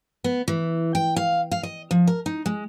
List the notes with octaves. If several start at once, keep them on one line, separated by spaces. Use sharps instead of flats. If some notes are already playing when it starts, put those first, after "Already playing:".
B3
E3
G5
F5
F5
D#5
F3
A#4
D#4
G#3